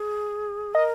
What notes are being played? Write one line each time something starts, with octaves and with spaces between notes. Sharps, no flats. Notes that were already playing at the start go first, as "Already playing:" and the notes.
Already playing: G#4
A#4 D#5